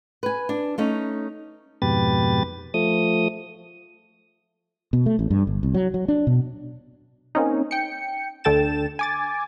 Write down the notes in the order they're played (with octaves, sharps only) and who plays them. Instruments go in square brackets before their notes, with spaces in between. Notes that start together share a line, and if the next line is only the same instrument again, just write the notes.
[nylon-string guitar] B4 G#5
D4
A3 C#4 D#4
[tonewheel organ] F2 G#2 B2 G4 B4 A6
F3 A3 D#6
[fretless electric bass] B2
A3
A1
G2
G1
C2
F#3
F#3
D4
B2
[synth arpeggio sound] A#3 C4 C#4 D#4
G5 C#7
D2 D3 A4 G5 A6 E7
G#5 D6 A6